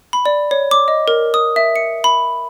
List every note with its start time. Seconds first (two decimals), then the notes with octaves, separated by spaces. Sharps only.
0.13 B5
0.26 D5
0.51 C#5
0.71 D6
0.88 D#5
1.08 A#4
1.34 D#6
1.56 E5
1.76 C#7
2.04 B5